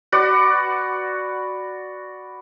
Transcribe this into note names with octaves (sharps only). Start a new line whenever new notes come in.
F#4 B4 D5 F#5